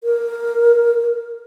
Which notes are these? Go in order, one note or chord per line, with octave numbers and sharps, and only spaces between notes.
A#4